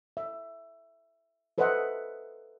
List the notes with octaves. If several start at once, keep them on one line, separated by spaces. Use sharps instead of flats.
E5
A4 B4 C5 D#5 E5 F#5